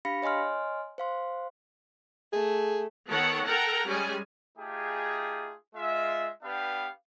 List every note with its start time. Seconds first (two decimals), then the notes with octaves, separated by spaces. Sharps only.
0.05 D4 G4 F5 B5 A#6 C#7
0.22 C#5 D#5 G#5 C6 F6
0.98 C5 F5 C6
2.33 A3 G#4
3.07 D#3 B3 A4 C#5 F#5
3.44 A4 A#4 F#5 G5 A#5
3.87 G3 G#3 C#4 G#4 G#5
4.57 A3 D#4 F4 G4 G#4
5.75 G#3 F4 E5
6.43 B3 D4 G4 B4 F5 G5